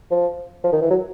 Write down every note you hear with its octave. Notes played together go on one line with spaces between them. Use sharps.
F3
F3
D#3
E3
F#3